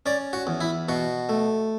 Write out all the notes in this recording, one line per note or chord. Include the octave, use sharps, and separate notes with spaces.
C#4 D5
F#4
E2
E4
B2 F#4
A3